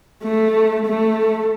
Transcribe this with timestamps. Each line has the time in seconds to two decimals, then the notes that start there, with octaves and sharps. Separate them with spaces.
0.24 A3
0.86 A3